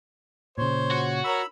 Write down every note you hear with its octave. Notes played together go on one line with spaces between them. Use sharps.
A#2 C#3 C5 C#5
F#4
A#4 C#5 B5 E6